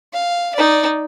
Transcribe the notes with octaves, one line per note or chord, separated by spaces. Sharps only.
F5
D#4 D5